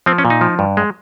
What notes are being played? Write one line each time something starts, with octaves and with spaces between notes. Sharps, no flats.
F3 C4
C#4
A#2
D#4
F3
G2
G#3